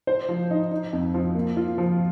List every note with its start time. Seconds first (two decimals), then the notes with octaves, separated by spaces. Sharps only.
0.07 C5
0.28 F3
0.51 D#4
0.71 D#4
0.93 F2
1.14 F3
1.35 A#3
1.57 F4
1.78 F3